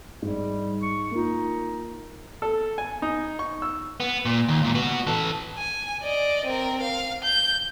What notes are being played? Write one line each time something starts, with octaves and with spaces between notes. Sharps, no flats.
G#2 G3
C#6
A#3 D#4 F4
A4
G#5
D#4
C#6
E6
B3
A#2
D#2
C#2 A#2
B3 F#4
E3 A4
G#5
D5 D#5
C4 A#4
F5
G6